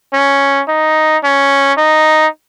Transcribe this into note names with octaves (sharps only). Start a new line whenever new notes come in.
C#4
D#4
C#4
D#4